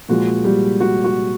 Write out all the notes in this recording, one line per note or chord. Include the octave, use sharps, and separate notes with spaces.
A#2 F3 G#3 F#4
G3 G4
F#4
F#4